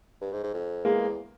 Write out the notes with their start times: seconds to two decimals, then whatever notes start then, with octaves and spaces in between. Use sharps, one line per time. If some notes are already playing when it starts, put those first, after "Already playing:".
0.21 G2
0.33 G#2
0.43 G#2
0.54 F2
0.85 E2 G#3 A#3